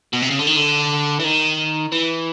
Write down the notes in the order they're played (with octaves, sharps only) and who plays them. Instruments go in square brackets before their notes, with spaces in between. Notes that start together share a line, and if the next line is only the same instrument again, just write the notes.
[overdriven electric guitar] B2
C3
C#3
D3
D#3
D3
E3
D#3
E3